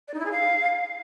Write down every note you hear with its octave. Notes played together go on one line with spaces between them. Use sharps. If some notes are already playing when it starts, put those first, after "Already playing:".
D5
D#4
E4
G#4
F5